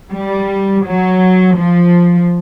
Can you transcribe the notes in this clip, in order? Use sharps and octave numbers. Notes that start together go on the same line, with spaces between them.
G3
F#3
F3